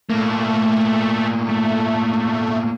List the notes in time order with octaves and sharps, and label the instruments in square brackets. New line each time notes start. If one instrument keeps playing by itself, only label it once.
[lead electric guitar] A2 A#3 [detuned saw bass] A3
[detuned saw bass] A3